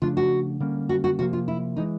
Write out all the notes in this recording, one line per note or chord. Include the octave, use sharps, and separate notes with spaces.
C#3 F3 A3 D4 F4
F#4
D3 G3 A#3 C#4
F#4
F#4
C3 F3 A#3 F#4
F4
E4
E3 G#3 D#4